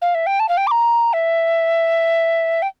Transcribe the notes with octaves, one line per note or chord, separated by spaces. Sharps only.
F5
E5
G5
A5
F5
G5
D6
A#5
E5
G5